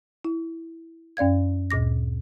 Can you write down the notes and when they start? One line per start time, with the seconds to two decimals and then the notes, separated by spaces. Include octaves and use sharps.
0.24 E4
1.17 F#2 C#4 D5 F5 G#6
1.71 D2 A#2 D6 A#6